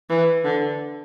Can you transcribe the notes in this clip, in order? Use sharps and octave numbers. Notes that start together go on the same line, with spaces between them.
E3
D3